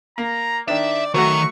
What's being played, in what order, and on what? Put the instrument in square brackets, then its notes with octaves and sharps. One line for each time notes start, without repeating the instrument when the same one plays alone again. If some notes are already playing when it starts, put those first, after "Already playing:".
[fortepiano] A#3 [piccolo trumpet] A#5
[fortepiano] D#3 D4 [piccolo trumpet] D5 [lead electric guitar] E5
[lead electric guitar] D#3 A#5 [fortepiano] F#3 A3 F#4 [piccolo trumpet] C#6